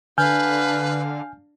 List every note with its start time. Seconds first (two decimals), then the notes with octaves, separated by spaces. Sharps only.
0.18 D3 D4 B4 F5 G#5 F6 G6